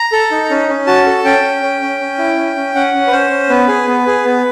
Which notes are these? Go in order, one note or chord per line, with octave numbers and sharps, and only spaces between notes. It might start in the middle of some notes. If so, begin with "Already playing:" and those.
Already playing: A#5
A4
D#4
C#4
C#4
F#4 A5
A4
C#4 G5
C#4
C#4
C#4
C#4
E4
C#4
C#4
C#4 F#5
C#4
B4
C#4 C5
C#4
B3 B4
G#4
B3
G#4
B3